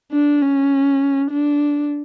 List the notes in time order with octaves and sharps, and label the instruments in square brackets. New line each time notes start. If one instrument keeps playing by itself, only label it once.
[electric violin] D4
C#4
D4